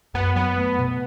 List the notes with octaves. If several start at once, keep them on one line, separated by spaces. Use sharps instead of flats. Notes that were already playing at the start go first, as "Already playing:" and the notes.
F#2 B3
F#3 B3
A3
B2